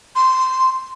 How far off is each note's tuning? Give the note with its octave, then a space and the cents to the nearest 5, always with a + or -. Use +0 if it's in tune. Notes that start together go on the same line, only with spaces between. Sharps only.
C6 -10